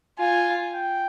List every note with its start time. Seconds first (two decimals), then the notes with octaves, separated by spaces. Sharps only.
0.19 F4 G#5
0.73 G5